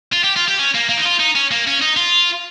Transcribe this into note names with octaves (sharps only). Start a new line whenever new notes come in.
F4
G4
F4
G4
C#4
A#3
A#3
D#4
F4
D#4
C#4
A#3
C#4
D#4
F4